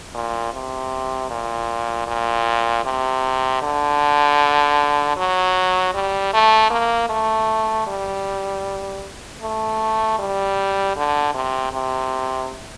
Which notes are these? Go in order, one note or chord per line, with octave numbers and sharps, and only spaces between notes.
A#2
C3
A#2
A#2
C3
D3
F#3
G3
A3
A#3
A3
G3
A3
G3
D3
C3
C3